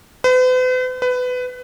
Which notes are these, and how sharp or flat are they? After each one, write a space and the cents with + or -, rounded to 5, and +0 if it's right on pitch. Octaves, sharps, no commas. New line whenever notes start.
B4 +45
B4 +20